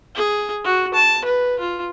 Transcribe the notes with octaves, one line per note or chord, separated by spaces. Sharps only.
G#4
F#4
A5
B4
F4